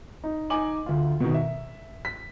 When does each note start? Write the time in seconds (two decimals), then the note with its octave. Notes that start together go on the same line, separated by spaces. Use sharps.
0.24 D#4
0.50 D#4 G#5 D6 F#7
0.86 D2 F4
1.20 B2 D#3
1.34 E5
2.05 B6